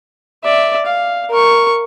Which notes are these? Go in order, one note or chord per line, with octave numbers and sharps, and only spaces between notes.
D5 E5
F5
A#4 C#6